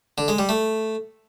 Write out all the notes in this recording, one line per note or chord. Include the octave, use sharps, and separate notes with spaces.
D3
G#3
G3
A3